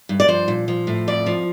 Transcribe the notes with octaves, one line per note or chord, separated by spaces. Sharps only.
G2
D5
F3 C5
A#2
F3
A2
F2 D5
F3